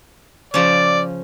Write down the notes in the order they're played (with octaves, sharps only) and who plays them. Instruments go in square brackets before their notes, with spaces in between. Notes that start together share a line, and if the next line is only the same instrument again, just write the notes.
[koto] C#3 F3 C#4 [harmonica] D5